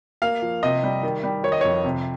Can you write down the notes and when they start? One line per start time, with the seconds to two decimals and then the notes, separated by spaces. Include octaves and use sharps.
0.22 A#3 F5
0.42 F3
0.63 C3 D#5
0.84 G3
1.03 D#3
1.24 G3
1.43 D#3 C#5
1.52 D#5
1.61 F2 C#5
1.84 C3